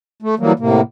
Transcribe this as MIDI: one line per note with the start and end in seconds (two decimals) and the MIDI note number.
0.22 0.35 57
0.39 0.52 52
0.39 0.52 54
0.39 0.52 55
0.39 0.52 58
0.59 0.81 45
0.59 0.81 48
0.59 0.81 58